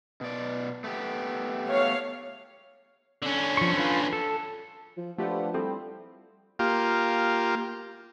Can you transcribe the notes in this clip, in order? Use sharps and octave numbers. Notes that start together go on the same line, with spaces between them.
B2 D5
A3 B3 G4
C#5 F5
D3 C#4
F3 C#6
F4 B4
A4
F3
F3 A3 D4 F4 G4 B4 F#5
G3 C4 E4 A4
A#3 F4 G4